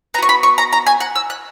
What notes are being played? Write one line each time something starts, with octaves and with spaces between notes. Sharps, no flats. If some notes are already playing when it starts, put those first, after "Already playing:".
B3 F#4 A#5 C#6
B5
C#6
A#5
A#5
G#5
F#5
E6
F#6